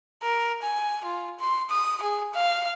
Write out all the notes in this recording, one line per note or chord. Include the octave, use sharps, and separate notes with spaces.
A#4
G#5
F4
C6
D#6
G#4
F5